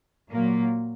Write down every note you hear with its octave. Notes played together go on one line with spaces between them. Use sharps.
A#2 F#3 A#3